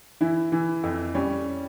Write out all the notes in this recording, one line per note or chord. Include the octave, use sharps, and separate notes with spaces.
E3 E4
E3
F2
G3 C#4